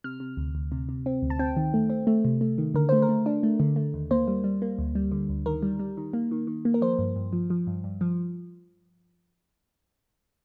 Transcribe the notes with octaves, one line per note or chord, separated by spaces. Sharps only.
C3 F6
C3
D2
D2
C3
C3
C4
D2
A5
C4 G5
D#3
A3
C4
A3
C3
A3
D#3
D3 A#4
A3 C5
A#4
A3
D4
A3
D3
A3
D#2
A#3 C5
G3
G3
A#3
D2
G3
D3
D2
D#3 A#4
G3
G3
D#3
A#3
D#3
D#3
A#3
A#4
F3 C5
G2
G2
F3
F3
G2
G2
F3